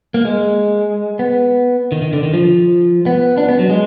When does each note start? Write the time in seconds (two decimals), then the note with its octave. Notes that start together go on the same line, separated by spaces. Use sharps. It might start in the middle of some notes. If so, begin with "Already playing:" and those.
0.14 A#3
0.25 G#3
1.19 B3
1.92 D#3
2.02 D#3
2.13 D3
2.23 D#3
2.34 F3
3.06 B3
3.38 D4
3.49 B3
3.59 F#3
3.70 G#3